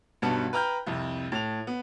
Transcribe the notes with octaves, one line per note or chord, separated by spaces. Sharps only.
B1 G2 B3 F#4 F#5 A5
B4 G5 A#5 F6 G6
C2 F2
A2 F7
B3